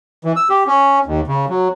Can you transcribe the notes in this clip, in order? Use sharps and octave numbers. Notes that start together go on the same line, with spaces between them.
E3
E6
G4
C#4
D#2
C#3
F#3